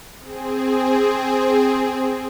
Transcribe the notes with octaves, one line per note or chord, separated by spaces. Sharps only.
C4 G#4